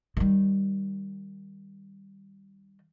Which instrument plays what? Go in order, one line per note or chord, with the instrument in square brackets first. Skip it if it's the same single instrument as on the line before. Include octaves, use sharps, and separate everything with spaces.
[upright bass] D#3 G3